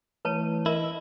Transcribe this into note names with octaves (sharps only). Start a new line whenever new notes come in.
E3 A3 B4 C#5 A5
E4 A#4 D#5